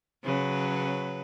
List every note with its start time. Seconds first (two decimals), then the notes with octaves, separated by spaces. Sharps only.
0.24 C#3 F#3 B4